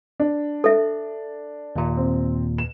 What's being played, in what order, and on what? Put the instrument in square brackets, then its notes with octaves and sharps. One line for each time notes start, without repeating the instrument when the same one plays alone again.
[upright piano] D4
[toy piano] A4 E5
[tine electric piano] D#2 A#2
[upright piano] C4
E7